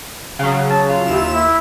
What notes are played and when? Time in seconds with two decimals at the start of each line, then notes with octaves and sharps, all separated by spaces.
0.39 C#3 F#3 F5
0.70 A5
0.89 F4
1.06 D#2 E4 E7
1.31 E4